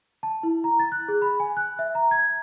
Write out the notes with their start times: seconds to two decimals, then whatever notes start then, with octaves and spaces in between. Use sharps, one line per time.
0.23 A5
0.43 E4
0.64 A#5
0.80 A6
0.92 F#6
1.08 G#4
1.22 B5
1.40 G#5
1.57 F#6
1.79 E5
1.95 A#5
2.11 G#6